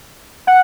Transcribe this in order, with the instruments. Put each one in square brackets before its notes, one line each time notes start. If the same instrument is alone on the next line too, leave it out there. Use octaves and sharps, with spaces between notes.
[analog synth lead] F#5